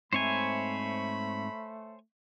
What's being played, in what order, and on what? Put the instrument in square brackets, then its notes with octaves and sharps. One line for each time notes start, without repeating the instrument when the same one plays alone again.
[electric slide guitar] G#2 C4 E5 [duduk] A3 [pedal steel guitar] C5 C#5 G#5 [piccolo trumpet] B5